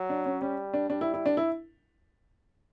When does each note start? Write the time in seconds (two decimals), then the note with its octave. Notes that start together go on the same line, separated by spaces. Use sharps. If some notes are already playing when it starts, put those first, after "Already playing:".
Already playing: F#3
0.10 D4
0.26 C#4
0.41 G3 C#4
0.73 D4
0.89 G3 D4
1.01 E4
1.14 E4
1.26 D4
1.37 E4